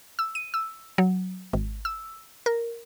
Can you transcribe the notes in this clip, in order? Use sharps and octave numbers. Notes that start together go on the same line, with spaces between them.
E6
D#7
E6
F#3
G#1
E6
A#4